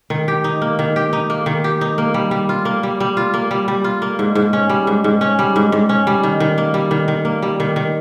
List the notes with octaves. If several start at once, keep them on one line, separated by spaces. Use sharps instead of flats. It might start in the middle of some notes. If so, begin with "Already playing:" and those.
D#3
G4
D#4
A#3
D#3
G4
D#4
A#3
D#3
G4
D#4
A#3
G3
G3
F4
A#3
G3
G3
F4
A#3
G3
G3
F4
A#3
G#2
G#2
C#4
G3
G#2
G#2
C#4
G3
G#2
G#2
C#4
G3
D#3
D#3
A#3
G3
D#3
D#3
A#3
G3
D#3
D#3